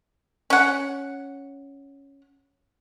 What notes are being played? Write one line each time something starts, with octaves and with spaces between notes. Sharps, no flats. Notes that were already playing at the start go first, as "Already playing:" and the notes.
C#4 F#5